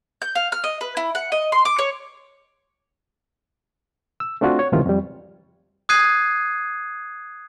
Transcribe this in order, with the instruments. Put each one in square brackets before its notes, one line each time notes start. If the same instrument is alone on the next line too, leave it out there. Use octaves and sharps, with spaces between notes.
[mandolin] G6
F5
F6
D#5
B4
E4
F#5
D#5
C6
D6
C#5
[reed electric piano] E6
A3 C4 D4 F4 F#4
C#5
C#2 A2 C3 D#3 E3 F4
F2 G3
[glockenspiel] D#6 F#6 G#6 C7 D#7